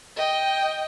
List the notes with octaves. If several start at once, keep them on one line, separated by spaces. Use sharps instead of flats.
D#5 G5